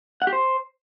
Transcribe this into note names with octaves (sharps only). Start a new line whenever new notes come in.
F#5
G4
C5